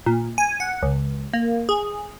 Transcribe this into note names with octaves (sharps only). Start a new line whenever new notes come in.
A#2
G#5
F#5
C#2
A#3
G#4